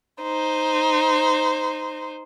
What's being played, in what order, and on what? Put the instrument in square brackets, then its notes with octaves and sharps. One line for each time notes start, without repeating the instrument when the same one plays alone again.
[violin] D#4 C5